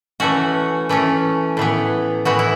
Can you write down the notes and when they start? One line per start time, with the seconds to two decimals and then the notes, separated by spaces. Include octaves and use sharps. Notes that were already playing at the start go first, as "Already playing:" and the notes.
0.20 E3 A3 C#4 F#4
0.89 E3 A3 C#4
1.57 A2 E3 B3
2.25 A2 E3 B3 F#4
2.39 E4